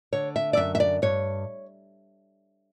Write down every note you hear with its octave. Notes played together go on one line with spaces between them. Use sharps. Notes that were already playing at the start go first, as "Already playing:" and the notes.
D3 C#5
E5
D5
F#2 E5
E5
D5
G2 C#5